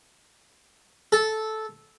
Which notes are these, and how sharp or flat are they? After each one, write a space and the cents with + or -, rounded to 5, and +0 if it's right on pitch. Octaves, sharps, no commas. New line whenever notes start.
A4 -10